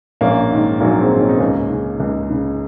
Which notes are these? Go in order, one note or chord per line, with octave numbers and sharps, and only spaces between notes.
A#1 A#3 C#4
G#2 D#3
A#1 F#3 A#3
G#3 C4
G#2 D#3
C#4
D#4
C#2 A#3 C#4
C#3
C#2
C#3